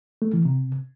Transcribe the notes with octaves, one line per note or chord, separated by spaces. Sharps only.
A3
E3
C3